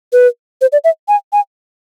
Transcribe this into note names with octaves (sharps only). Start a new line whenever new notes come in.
B4
C5
D5
E5
G#5
G#5